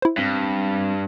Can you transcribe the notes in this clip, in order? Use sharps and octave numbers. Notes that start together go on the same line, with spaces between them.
E4 C5
G2 G3 C4